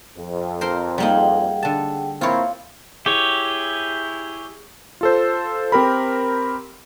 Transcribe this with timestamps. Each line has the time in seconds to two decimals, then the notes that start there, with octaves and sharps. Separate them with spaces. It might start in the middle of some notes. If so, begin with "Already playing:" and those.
0.17 F2
0.61 A#4 C5 C6
0.98 G3 A#3 D#4 G#4 F#5 G5
1.63 D3 A5
2.21 A#3 C4 E4 F4 C#5
3.06 E4 G4 G#4 C#5
5.01 F4 A4 C5
5.72 C4 G4 A#4 B5